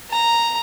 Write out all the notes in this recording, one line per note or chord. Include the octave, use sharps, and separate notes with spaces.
A#5